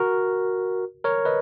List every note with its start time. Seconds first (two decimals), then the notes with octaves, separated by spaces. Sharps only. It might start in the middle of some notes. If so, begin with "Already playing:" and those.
Already playing: F#4 A#4
1.04 A#4 C#5
1.25 B4 D#5